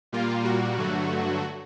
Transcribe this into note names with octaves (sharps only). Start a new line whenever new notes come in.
A#2 G3 A#3 F4
F#4
G2 D3 F#3 A3